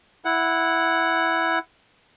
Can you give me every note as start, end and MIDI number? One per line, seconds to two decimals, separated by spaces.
0.25 1.59 64
0.25 1.59 78